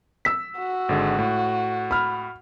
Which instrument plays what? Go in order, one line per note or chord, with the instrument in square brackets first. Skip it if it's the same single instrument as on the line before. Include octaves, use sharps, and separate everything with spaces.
[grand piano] E6 B6
[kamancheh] F#4
[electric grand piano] G#1 D3 G#3
A2
[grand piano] B5 F6